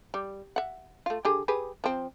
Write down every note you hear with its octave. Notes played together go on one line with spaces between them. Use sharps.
G3
E5 F#5
A3 F4
D3 G4 G#4
G4 G#4 B4
F3 C4